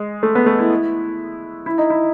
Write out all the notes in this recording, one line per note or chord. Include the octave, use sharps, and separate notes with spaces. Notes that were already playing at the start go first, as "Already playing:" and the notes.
Already playing: G#3
A3
B3
A3
E4
E4
D#4
E4